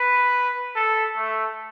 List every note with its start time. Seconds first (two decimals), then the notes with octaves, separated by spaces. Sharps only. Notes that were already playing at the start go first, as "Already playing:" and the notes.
Already playing: B4
0.75 A4
1.17 A3